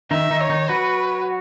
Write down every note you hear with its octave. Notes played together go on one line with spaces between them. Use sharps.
D#3 D#4 E5
D#3 D#4
C#5
D#3 D#4
F#3 F#4 B4